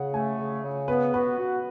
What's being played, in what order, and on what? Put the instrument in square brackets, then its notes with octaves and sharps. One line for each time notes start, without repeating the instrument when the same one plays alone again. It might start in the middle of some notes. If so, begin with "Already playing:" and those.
Already playing: [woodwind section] C#3 [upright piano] F#5
[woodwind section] A3 [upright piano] G#5
[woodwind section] C#3
C#3
[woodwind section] B3 [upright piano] B4
[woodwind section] F#4 [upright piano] B4
[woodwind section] F#4